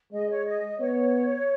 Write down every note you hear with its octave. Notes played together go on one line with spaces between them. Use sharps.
G#3 D#5
C#5
D#5
B3 C#5